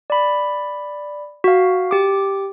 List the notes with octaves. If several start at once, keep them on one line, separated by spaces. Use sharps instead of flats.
D5 B5
F#4 F5
G4 D6